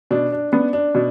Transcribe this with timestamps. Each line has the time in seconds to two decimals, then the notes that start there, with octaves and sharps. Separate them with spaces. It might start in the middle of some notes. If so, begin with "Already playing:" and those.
0.11 B2 D4
0.32 D4
0.52 B3 D4
0.73 D4
0.95 B2